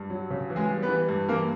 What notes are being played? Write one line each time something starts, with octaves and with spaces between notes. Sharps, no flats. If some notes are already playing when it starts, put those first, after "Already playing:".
Already playing: G2
F#3
C#3
E3
G#3 G#4
G3
B3 B4
E3
G2
E3 A#3 A#4